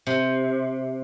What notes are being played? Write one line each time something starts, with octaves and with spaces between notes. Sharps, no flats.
C3